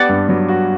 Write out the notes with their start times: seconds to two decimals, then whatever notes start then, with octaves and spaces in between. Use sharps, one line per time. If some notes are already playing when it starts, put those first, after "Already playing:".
Already playing: B3 G4 D5 F#5
0.09 G2
0.29 F#3
0.48 F#4